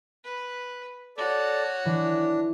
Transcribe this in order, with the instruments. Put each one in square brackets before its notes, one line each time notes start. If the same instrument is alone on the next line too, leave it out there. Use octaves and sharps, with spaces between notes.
[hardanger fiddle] B4
[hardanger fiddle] F#4 C#5 [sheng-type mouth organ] A4 D5
[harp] E3 [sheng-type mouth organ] D4